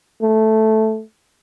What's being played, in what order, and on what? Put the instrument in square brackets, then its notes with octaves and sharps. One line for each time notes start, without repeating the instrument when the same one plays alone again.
[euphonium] A3